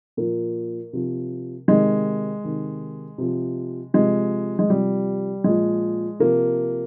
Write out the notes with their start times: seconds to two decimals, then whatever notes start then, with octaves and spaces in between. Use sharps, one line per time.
0.17 A#2 F3 A#3
0.93 C3 F3
1.68 C3 D#3 G#3
2.44 C3 D#3
3.18 C3 F3
3.94 C3 F3 G#3
4.59 G#3
4.69 C3 F3 G3
5.44 A#2 F3 G#3
6.19 C3 F3 A#3